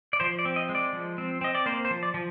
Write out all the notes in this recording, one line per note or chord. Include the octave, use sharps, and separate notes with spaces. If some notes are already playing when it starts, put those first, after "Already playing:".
D5
F3 C5
D5
C4
D#5
G#3
D5
F3
C4
C4 D#5
D5
A#3 C5
C5
F3
D5
F3